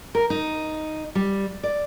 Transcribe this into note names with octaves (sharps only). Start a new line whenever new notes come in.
A#4
D#4
G3
D5